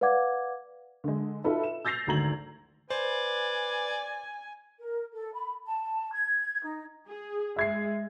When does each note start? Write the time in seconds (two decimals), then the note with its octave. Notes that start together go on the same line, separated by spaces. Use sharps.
0.01 B4 D5 F5 F#5 D6 G#6
1.04 D3 G#3
1.44 D#4 F4 F#4 A4 B4 E5
1.63 E7
1.85 E6 G6 A6 A#6 C7 F7
2.07 G#1 D2 F#4 A#5 G#6 F#7
2.90 B4 C5 D5 G#5
4.79 A#4
5.14 A4
5.34 B5
5.66 A5
6.13 G#6
6.64 D#4
7.07 G#4
7.56 G#3 E5 G#6 C7